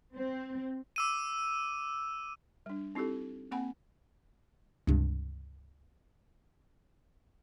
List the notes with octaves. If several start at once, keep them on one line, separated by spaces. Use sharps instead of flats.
C4
D6 E6 D#7
G3 D4
C4 D#4 E4 G4 A4
A#3 C4 F#5 G#5 B5
C#2 G2 C3